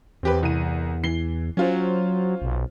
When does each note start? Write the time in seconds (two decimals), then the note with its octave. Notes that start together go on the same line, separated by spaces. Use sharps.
0.23 E2 C4 G4 B4
0.43 C2 D#7
1.03 E3 C7 G7
1.57 F#3 C#4 F4 C5
2.42 B1